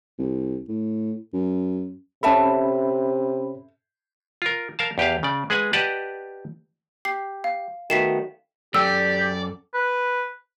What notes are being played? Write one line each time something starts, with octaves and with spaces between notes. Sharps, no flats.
C2
A2
F#2
C3 C#4 A4 E5 A5 B5
F4 A#4
A#4 F5 A5
E2 G4 B4 F5
C#3 D5
G#3 G#4 B4 F#5 G#5
G4 B4 D5 D#5 F#5 A5
G4 C7
F5
D#3 A3 B3 F#4 B6 C7 E7
F#2 G4 A4 D5 G5 E6
B4